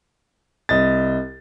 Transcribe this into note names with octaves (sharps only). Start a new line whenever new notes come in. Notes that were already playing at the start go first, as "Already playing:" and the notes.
C2 D#5 A6